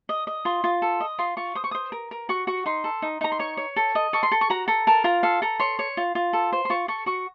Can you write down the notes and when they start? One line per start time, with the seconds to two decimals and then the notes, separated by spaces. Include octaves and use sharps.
0.09 D#5
0.27 D#5
0.45 F4 C6
0.64 F4
0.82 A4
1.00 D#5
1.19 F4 C6
1.37 F4 C#6
1.55 C5 D#6
1.64 C#6
1.71 C5 D#6
1.92 A#4
2.11 A#4
2.29 F#4 C#6
2.47 F#4 C#6
2.66 D#4 C6
2.84 A4
3.02 D#4
3.21 D#4 A#5
3.32 C6
3.39 C#5 C#6
3.57 C#5
3.76 A4
3.95 D#5
4.13 A4 C#6
4.23 C6
4.32 A4
4.41 C#6
4.50 F#4 A#5
4.68 A4 A#5
4.87 A#4 A5
5.04 F4 A#5
5.23 A4 F5
5.42 A4 A#5
5.60 C#5 C6
5.79 C#5
5.97 F4
6.15 F4
6.33 A4
6.53 C5
6.65 C6
6.70 F4 C#6
6.88 A4 C#6
7.06 F#4 C#6